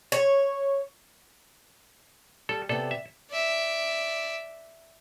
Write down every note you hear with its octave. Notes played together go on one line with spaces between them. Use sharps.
C#5
G3 A4
C3 B3 A4 D5
E5
D5 E5